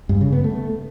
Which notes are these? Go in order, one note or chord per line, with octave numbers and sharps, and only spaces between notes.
G2
C#3
B3
A3